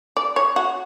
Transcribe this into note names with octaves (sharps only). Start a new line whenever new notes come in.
D5
C#5
F#4